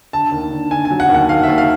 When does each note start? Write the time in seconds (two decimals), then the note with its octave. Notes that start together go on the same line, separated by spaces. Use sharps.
0.13 D3 A5
0.32 D#2
0.51 D3
0.71 D3 G#5
0.85 G#5
0.91 F#3
1.00 F#5
1.09 D#2
1.15 F#5
1.29 D#2 F5
1.43 E5
1.48 D#2
1.58 F5